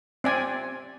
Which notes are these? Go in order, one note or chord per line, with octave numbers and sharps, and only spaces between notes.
C4 D5 G#5